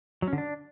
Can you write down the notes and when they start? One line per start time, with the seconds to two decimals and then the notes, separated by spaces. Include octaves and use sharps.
0.22 F#3
0.28 C#4
0.33 D3
0.38 D4